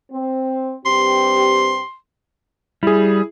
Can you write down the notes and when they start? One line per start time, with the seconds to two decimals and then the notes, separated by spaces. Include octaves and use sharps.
0.11 C4
0.86 G2 C4 G4 C6
2.83 G3 E4 G#4